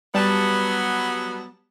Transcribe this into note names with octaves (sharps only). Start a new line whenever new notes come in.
F#3 G3 B3 A5